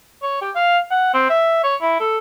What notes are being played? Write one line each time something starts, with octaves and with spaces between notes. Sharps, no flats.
C#5
G4
F5
F#5
C4
E5
C#5
E4
A4